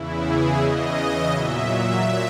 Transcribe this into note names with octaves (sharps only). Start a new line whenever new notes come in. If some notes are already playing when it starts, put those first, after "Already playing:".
Already playing: E2 C#3 E3 E4
G#4
E2 C#3 E3 D#5
A#2 F#3 E5
E5